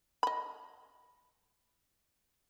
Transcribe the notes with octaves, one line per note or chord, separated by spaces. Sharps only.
D#5 B5